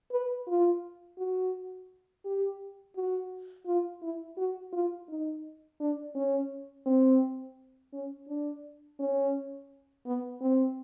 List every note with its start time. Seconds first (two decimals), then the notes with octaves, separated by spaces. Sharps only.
0.11 B4
0.47 F4
1.18 F#4
2.25 G4
2.96 F#4
3.66 F4
4.02 E4
4.38 F#4
4.73 F4
5.09 D#4
5.80 D4
6.15 C#4
6.86 C4
7.93 C#4
8.28 D4
8.99 C#4
10.06 B3
10.41 C4